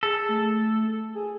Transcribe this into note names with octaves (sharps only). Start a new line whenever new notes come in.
G#4 A4
A3
G#4